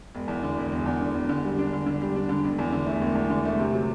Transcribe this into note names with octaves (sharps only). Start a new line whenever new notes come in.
E1
E2
D3
E1
E1
E2
D3
E1
D3
G3
D4
D3
D3
G3
D4
D3
E1
E2
D3
A3
E1
E2
D3
A3
C3
F#3